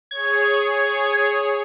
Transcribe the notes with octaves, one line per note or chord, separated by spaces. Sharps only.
G#4 C#5 G#6